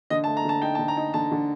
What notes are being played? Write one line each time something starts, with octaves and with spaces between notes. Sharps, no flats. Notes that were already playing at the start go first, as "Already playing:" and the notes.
D3 D#5
A5
A3
A#5
D3 A5
D#4 G5
A5
D3
A#5
D#4
D3 A5
D3